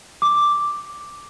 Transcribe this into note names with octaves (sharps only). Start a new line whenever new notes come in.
D6